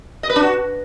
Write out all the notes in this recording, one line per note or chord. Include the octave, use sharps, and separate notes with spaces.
D#5
B4
D4
F#4